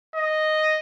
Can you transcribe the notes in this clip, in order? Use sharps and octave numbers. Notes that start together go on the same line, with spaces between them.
D#5